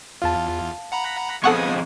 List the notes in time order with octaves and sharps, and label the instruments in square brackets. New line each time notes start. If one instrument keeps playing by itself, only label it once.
[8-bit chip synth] E2 F4 [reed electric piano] F5 A5
[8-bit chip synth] F#5 A#5 B5
[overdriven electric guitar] F2 G#3 [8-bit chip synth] B3 G#5 D#6 [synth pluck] A4 F#5 C#6